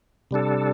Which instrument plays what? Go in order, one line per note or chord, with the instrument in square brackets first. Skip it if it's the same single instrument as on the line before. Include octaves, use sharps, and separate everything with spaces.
[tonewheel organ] C3 G3 D4 A4